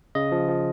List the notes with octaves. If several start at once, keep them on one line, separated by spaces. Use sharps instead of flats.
C#3 D#5
F3
F3